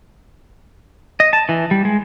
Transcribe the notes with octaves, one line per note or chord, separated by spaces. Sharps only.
D#5
A5
E3
G3
G#3